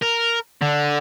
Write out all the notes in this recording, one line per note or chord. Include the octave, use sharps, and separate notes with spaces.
A#4
D3